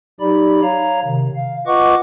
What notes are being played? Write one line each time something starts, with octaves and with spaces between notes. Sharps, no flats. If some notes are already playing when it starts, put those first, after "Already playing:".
F#3 D#4 G4 D5 B5
C#5 F5 A#5
C3 D#3
F5
F4 B4 D#5 F#5 C#6 D6